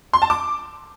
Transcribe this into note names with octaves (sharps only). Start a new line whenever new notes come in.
C6
A5
D6